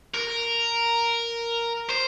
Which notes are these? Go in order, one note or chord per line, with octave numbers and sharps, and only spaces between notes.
A#4
C5